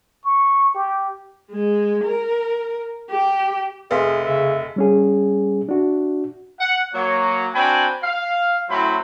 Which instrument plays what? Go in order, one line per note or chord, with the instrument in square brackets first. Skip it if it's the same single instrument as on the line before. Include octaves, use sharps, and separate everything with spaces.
[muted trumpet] C#6
G4
[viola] G#3
A#4
G4
[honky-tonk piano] F1 [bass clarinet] G#4 [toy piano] B4 F5 C6 [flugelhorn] E5
[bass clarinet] C#3 [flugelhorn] E5
[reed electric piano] G3 C#4 G#4
D4 F#4
[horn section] F#5
F#3 A#3 C#5
C4 D4 F#4 G5 G#5 B5
F5
A2 F#3 C#4 E4 C5 B5